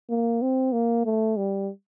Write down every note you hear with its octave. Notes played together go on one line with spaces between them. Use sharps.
A#3
C4
A#3
A3
G3